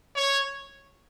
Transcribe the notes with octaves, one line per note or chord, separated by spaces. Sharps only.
C#5